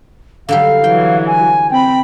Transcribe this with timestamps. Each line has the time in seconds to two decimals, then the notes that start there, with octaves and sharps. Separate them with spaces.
0.49 D3 F#3 G3 F5
0.84 E3 F#3 G5
1.26 G#5
1.70 C4 G5 B5